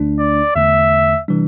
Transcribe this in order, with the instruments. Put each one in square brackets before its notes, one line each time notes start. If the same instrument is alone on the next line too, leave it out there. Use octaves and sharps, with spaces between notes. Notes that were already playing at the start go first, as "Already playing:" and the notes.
Already playing: [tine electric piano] D2 D3 A3 D4
[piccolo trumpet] D5
[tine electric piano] E2 D3 A3 [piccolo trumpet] E5
[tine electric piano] C3 E3 G3 D4